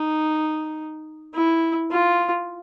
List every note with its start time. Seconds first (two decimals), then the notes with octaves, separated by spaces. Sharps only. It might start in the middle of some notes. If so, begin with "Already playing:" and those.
Already playing: D#4
1.35 E4
1.91 F4